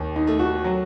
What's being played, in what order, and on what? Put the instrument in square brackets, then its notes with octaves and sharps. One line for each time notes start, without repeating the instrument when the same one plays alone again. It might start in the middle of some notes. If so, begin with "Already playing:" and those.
Already playing: [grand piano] D#2
[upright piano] D#4
[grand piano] A3
[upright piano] F#4
[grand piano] F#3